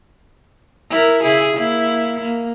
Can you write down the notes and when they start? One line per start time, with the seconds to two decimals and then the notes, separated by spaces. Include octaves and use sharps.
0.90 E4 A#4
1.23 C#3 E4 G#4
1.56 A#3 E4
2.21 A#3